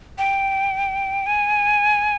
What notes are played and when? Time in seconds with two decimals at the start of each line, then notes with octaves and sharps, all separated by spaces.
0.18 G5
1.26 G#5